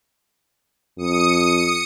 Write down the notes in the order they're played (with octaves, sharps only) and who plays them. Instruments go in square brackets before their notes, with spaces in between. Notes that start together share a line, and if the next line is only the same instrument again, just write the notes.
[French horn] F2 [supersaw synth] D#6 C#7